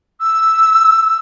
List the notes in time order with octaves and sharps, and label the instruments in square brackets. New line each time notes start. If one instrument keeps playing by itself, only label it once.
[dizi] E6